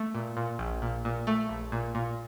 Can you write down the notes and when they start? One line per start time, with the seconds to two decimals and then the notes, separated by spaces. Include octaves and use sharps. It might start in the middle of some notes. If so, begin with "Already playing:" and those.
Already playing: A3
0.15 A#2
0.37 A#2
0.59 A#1
0.82 A#2
1.05 A#2
1.27 A3
1.49 A#1
1.72 A#2
1.95 A#2